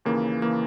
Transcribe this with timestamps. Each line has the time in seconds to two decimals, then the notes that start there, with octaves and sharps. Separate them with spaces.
0.05 D#2 C#3 E3 A#3
0.42 C#3 E3 A#3